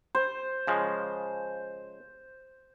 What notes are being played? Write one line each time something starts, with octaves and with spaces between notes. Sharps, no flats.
C5
C#3 F3 G#3